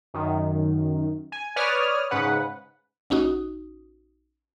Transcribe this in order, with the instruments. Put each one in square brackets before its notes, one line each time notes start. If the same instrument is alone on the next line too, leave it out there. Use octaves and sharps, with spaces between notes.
[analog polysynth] F#2 D#3
G#5
B4 C#5 D5 D#6 F6
G#2 C#3 B4 F#5
[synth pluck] A#1 C#4 D#4 F#4 D#6